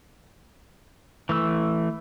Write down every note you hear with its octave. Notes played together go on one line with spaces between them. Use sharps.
E3 A3 E6